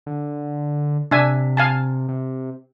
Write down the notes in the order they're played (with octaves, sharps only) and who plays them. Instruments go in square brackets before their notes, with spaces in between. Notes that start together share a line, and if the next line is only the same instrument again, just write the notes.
[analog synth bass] D3
[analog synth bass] C3 [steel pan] D4 E5 G#5
[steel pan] F5 G#5 A5
[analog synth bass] C3